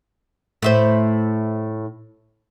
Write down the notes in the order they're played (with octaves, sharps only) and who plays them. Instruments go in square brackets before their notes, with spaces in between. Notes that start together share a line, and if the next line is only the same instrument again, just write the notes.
[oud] A2 E4 C5